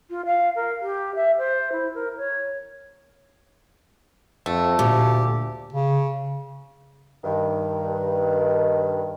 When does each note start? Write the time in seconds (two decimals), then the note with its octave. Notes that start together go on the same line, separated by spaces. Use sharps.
0.10 F4
0.26 F5
0.56 A#4
0.81 G4
1.15 E5
1.38 C5
1.72 E4
1.95 A#4
2.17 C#5
4.46 F2 A3
4.79 D2 A#2 G4
5.72 C#3
7.24 G2 D#3